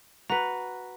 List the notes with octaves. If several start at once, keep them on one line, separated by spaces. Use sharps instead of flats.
F#4 B4 A#5